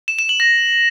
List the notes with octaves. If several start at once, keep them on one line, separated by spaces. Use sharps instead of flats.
E7
E7
F#7
A#6